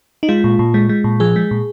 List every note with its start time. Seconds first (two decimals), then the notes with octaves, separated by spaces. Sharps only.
0.23 D#4
0.29 G#3 F4
0.44 A#2
0.59 A#2
0.74 G#3
0.89 G#3
1.04 A#2
1.20 F3 G#4
1.36 G#3
1.51 A#2